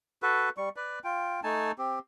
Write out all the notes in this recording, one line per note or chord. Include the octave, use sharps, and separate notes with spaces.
F#4 A4 B4
G3 C#6
B4 D5
F4 G5
A3 D#4 G#5 A5
C4 G4